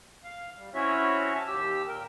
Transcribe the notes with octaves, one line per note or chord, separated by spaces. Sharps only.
F5
G3
C4 C#4 E4 F#4 C#5 E5
A5
D#2 G4 E6
A#2 A#4 G5